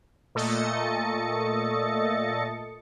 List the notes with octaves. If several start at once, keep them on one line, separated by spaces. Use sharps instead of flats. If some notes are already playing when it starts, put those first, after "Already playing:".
A#2 A3 A4 D#5 A6 C#7